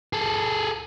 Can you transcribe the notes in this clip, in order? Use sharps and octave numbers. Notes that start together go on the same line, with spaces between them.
G#4 A4